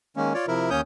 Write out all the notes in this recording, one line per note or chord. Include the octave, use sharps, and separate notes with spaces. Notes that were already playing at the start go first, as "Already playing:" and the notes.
D#3 G#3 A#3 C#4
F4 C#5 D5
C3 F3 E4 A#4
D#2 A#3 C#4 C#5 D#6 G6